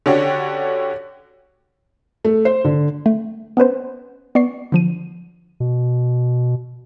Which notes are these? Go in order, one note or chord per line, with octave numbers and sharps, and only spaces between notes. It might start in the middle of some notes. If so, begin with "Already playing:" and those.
D3 C#4 D4 F#4 G4
A3
C5
D3
A3
B3 C#4 B4 C5
B3 D5 C#6 C7
D3 F3 D#7
B2